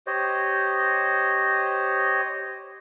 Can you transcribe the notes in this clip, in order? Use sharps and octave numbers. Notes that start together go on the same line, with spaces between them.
G4 C5 C#5 D#5